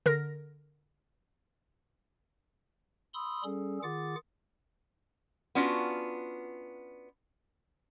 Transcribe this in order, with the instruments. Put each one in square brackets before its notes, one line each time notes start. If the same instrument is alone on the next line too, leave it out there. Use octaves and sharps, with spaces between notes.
[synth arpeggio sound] D3 A#4 F6 A#6
[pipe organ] B5 C6 D#6 E6
G3 C#4 G#4 A4
D#3 F4 G#4 F#5 D6 A6
[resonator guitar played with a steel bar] B3 C#4 D4 F4 F#4